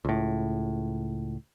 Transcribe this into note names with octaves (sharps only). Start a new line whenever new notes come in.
C#2 A2